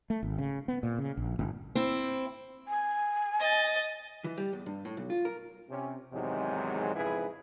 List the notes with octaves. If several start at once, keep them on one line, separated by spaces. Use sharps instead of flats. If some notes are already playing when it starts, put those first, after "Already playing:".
A3
G#1
C#3
B3
A#2
C#3
A#1
G1
C4 E4
G#5
D#5 A6
E3
G3
E2
G2
A2
B1
F4
A#4
C3 C#4
E2 G#2 C3 D#3 F#3 G#3
F2 G#2 C#3 E4 G#4 B4